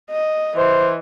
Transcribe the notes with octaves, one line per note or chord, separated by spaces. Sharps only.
D#5
E3 C5